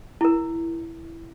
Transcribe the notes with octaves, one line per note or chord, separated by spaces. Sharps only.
E4 A#4